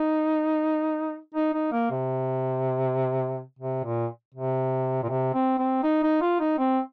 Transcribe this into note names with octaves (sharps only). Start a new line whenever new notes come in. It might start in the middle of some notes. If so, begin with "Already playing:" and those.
Already playing: D#4
D#4
D#4
A#3
C3
C3
A#2
C3
A#2
C3
C4
C4
D#4
D#4
F4
D#4
C4